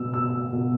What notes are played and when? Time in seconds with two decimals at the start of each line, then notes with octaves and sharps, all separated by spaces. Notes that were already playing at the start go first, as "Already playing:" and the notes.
Already playing: B2 B3 E6
0.13 E6
0.53 B2 B3